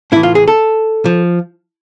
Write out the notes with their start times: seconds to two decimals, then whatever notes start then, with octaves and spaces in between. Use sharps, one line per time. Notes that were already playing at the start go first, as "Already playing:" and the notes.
0.12 A2 E4
0.16 E3
0.23 F4
0.35 G#4
0.48 A4
1.05 F3